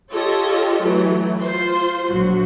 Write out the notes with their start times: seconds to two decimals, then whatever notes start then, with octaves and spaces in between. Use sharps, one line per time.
0.11 F4 G4 A4 C#5 D#5
0.83 E3 F#3 A3
1.41 F4 C5 C6
2.05 A#1 F#3 F#4